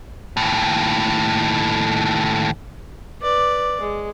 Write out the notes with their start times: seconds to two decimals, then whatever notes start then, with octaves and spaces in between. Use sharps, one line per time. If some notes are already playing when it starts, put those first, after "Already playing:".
0.37 D#2 A2
3.21 B4 D5
3.80 G#3